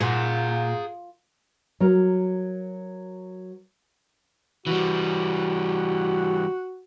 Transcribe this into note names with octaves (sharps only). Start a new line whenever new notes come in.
A#2 G#4 F#5
F#3 A#4
E3 G3 F#4